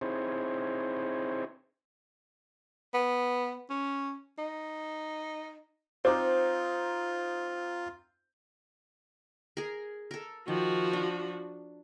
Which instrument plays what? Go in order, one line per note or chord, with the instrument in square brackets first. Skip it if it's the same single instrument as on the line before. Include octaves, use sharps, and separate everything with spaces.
[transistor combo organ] C4 D#4 E4 G#4 C5 C#5
[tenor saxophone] B3
C#4
D#4
[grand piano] C4 D#4 [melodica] F4 [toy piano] C5 D6
[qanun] G#4 A#4
A4 A#4
[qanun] D#3 [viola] F3 F#4
[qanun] D4